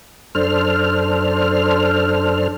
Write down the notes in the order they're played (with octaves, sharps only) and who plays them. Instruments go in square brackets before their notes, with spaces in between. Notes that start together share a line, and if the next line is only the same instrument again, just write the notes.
[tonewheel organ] F#2 D4 A4 C5 F6